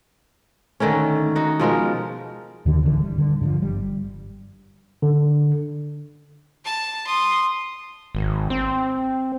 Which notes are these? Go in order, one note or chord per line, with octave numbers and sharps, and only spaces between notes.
D3 D#3 A3 C#4
D#4 F#4
B2 F3 G#3 A#4
D#2 D3
D1 D2 D3 E3
G3
D3
G2 D3 F3
G1 G3
D3
A5
C6 D#6
G#1
C4